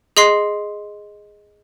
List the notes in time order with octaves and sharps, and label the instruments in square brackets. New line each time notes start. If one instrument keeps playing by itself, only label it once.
[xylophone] G#4 D#5 C6 C7